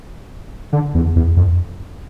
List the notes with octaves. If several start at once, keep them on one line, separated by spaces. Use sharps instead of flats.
D3
E2
E2
F2